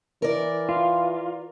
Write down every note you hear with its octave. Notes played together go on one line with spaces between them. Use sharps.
E3 A#4 D5
F4